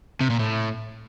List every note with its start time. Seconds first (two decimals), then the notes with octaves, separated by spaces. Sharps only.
0.21 C3
0.30 A#2
0.39 A2